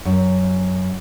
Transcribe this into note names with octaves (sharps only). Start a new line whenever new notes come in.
F#2